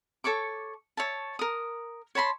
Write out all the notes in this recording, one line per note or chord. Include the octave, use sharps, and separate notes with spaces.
A4 C#5 C#6 D6
C#5 E5 A5
A#4 D#6
C#5 A5 B5 C6